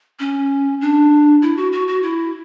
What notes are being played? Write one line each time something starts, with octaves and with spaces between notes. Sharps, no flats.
C#4
D4
E4
F#4
F#4
F#4
E4